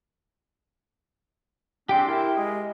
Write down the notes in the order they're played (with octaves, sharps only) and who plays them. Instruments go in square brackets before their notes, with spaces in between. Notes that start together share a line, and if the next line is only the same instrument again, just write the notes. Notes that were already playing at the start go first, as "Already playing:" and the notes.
[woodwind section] G#3 C4 D4 [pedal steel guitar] G4 G5 C6
[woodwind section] E4 A#4
G#3 D#5